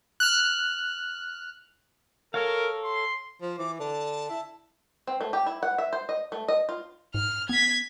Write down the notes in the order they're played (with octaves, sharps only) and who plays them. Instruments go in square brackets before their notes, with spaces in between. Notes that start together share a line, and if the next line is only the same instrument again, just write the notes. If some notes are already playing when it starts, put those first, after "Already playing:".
[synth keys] F6 F#6
[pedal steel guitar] A4 C#5 F5 [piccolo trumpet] A#4
[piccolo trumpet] C6
[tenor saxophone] F3
[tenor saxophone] E3 [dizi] D6
[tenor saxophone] D3 [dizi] A5
[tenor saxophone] E4
[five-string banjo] C4
A3
G4
E4
F#5
E5
C5
D#5
A3
D#5
F4
[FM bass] G#2 [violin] F6
[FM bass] B3 [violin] G#6 B6